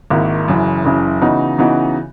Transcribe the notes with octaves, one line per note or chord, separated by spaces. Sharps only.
G#1 G#2 D#3 A#3 E4
F#1 F#2 C#3 E3
F#1 F#2 C#3 E3
C#3 E3 B3 D#4 F#4
C#3 E3 B3 D#4 F#4